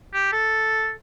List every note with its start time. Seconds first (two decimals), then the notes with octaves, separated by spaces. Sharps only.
0.14 G4
0.33 A4